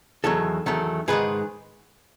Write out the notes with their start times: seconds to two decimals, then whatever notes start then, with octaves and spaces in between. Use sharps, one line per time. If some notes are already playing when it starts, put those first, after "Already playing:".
0.24 E2 D#3 F#3 A4 C#5
0.66 E2 D#3 F#3 A3
1.08 G#2 D#3 G#3 G#4 B4